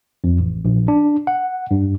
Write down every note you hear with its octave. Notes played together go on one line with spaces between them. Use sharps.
F2
A1
A#1
D4
F#5
G2